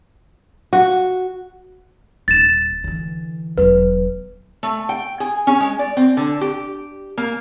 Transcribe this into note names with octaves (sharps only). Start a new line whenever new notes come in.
F#4
D#1 A6 E7
D3 E3
E1 F#3 B4
A3
G5
G#4
C#4
G#3
D5
C4
D3
G4
A#3